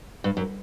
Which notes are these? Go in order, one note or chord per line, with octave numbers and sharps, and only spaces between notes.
G2
F#2